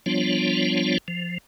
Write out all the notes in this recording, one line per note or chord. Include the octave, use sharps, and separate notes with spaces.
F3 G3 B3 D4 F4 C#5
F3